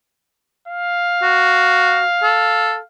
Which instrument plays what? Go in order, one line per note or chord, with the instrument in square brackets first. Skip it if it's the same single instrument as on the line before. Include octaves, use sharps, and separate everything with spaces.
[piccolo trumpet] F5
[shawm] F#4
A4